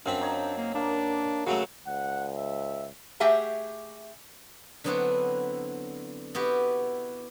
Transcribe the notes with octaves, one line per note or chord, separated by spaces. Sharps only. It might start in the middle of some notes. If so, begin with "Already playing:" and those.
F#2 C4 D4 F5 B5
D#4 C#5
A#3
A#3 D4
C#3 F#3 A3 F#4
C#2 F#5
E5
A3 G4 G#4 E5 F#5
D3 F#3 B3 C4 E4 F#4
B3 E4 F#4 G4